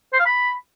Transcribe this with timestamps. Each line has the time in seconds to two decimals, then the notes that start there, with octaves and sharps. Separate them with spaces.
0.13 C5
0.20 F5
0.26 B5